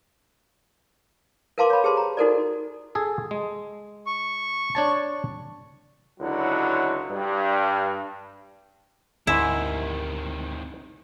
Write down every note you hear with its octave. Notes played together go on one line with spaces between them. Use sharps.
A#4 B4 F5 A5 C6 D6
C#5 B5
G4 G#4 C5 A5 C6
A#5
D#4 F#4 A4 A#4 C5 D5
G#4 A4
G#3
C#6
D4 C#5 A5
C#2 D3 F#3 E4 F#4
G2
D2 G#2 C3 D#3 E4 A#4